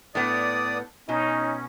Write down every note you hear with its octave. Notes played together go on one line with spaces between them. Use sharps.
A2 B3 D5 D#6
B2 C#4 D#4